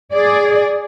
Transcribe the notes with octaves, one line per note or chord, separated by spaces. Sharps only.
G#4 D5